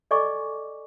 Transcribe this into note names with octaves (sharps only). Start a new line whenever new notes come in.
A4 D5 D#5 G#5 C#6 D6